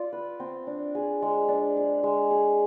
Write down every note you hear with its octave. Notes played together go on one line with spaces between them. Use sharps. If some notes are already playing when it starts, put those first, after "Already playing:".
Already playing: F4 D5
B4
C4
D4
G#4
G#3
D4
G#4
G#3
G#4